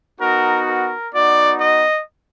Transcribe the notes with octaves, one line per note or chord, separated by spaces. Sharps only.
B3 D#4 F#4 A#4
A#4
B3 D#4 F#4 D5
D#5